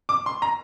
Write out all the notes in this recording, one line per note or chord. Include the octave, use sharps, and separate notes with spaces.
D6
C6
A#5